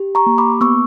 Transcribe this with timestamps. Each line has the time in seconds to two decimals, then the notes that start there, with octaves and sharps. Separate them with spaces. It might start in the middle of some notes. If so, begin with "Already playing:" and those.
Already playing: G4
0.15 A#5 C#6
0.26 A#3
0.38 B5 D6
0.61 B3 C#6 E6